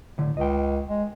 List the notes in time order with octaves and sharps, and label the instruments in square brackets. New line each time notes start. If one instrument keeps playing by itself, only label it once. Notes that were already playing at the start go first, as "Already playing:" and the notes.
[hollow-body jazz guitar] A2 D3
[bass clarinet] C#2 [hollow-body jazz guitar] D#5 G5
[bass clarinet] G#3